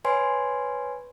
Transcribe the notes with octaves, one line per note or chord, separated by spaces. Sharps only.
B4 C#5 G#5 C6